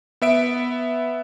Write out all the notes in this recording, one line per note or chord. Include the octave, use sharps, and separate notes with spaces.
B3 E5 D7